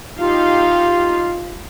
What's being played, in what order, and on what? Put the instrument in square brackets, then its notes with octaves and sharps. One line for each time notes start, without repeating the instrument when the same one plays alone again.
[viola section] D#4 G4 F5 [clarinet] F4